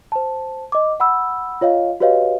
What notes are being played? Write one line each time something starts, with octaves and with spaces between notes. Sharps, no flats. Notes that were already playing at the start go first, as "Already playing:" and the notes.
C5 A5
D#5 D6
F#5 B5 E6
F4 C#5 D#5 F5
F#4 G4 B4 C#5 D#5 F5